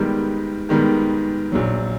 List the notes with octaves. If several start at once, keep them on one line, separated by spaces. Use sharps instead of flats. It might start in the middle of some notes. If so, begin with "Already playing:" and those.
Already playing: G#2 D#3 G3 B3
G#2 D#3 G3 B3
A#1 A#2 F#3